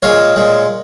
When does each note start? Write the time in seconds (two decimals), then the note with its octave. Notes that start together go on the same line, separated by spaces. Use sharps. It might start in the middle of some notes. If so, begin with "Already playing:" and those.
0.02 A#2 G#3 C#5 F5
0.36 A#2 G#3